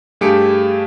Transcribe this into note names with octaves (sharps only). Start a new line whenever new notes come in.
G2 A3 G4 G#4 C#7 D7